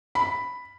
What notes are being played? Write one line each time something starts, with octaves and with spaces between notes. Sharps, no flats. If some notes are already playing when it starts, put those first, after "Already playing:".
B5